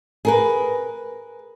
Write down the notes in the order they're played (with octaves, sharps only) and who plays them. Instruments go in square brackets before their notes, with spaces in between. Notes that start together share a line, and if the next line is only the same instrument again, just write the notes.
[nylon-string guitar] G#4 A#4 B4